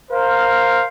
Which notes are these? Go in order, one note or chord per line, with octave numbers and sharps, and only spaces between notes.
A#4 C5 F5